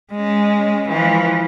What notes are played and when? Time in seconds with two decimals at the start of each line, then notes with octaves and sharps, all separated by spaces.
0.12 G#3 C#4
0.89 E3 F3